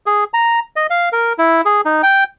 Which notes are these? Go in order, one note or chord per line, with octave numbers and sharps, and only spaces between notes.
G#4
A#5
D#5
F5
A#4
E4
G#4
D#4
G5